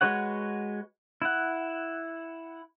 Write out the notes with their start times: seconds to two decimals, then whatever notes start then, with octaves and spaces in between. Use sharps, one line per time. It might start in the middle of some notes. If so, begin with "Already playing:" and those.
0.01 G#3 F#4 B4 C#5 F#5
1.22 E4 F#5